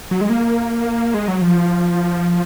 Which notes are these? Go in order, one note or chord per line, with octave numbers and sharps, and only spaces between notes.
F#3
G#3
A#3
G#3
F#3
F3